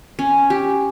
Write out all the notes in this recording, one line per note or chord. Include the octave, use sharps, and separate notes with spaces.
C#4
G4